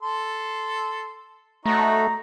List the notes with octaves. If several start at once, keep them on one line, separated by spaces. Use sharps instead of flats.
A4 C6
A3 D#4 F#4 C#5 A#5